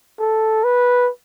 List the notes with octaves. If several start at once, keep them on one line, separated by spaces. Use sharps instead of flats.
A4
B4